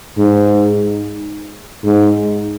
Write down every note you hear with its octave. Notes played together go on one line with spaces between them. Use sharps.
G#2
G#2